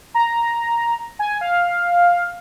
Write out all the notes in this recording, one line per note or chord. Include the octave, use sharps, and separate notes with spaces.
A#5
G#5
F5